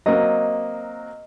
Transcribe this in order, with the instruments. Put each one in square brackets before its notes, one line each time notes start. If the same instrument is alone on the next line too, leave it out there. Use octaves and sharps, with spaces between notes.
[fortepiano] F#3 A#3 C4 [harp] D#5